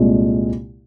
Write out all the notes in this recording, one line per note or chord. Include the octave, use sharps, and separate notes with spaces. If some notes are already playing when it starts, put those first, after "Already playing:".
Already playing: C2 A#2 G#3